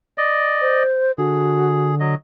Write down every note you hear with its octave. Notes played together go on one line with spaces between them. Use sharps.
D5 D#5
C5
D3 F#4 G#4
F#3 D#5